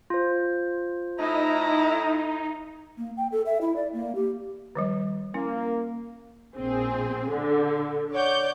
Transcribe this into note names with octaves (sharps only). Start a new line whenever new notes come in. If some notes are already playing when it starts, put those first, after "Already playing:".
F4 C5
A2 D#4 E4 D#5 A#5
A#3
G5
A4
E5
E4
D5
A#3
G4
D#3 F3 G3
A#3 C#4 E4
A#1 C4 G#4
D3
C#5 D5 F#5 D6 G6